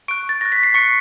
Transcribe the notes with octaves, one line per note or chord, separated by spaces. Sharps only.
C#6 F#6 D7
A6
C#6 F#6 A#6
B6
C7
C#6 F#6 C#7